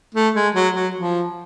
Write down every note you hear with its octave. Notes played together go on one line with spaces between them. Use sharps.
A3
G#3
F#3
F#3
F3